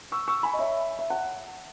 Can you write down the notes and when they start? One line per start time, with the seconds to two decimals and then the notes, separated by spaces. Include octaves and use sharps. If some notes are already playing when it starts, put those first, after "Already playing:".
0.12 C#6 E6
0.28 C#6 E6
0.43 G#5 B5
0.53 D#5
0.59 C#5 E5
0.99 E5
1.10 F#5